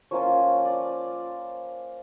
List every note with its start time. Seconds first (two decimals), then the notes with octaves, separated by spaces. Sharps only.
0.11 F3 A#3 C#4 F4 C#5
0.65 D5